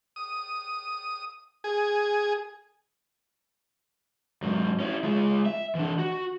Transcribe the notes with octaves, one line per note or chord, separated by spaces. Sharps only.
D#6
G#4
G#2 F#3
C#4 E4
G#3 F4
E5
E3 D4
F#4